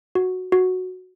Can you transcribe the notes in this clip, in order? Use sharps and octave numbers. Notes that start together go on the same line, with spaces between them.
F#4
F#4